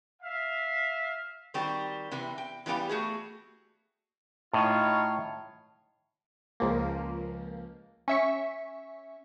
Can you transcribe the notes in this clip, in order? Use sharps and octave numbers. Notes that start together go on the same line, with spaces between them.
E5 F5
D#3 G3 C4 F#4 G4
C3 E3 B3
G5
E3 G3 B3 G4 F5
A3 F#4 G#4
A2 D#4 F4 C#5
C#2 F3 A#3
C#4 E5 C#6